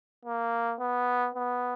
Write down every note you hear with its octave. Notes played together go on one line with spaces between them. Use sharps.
A#3
B3
B3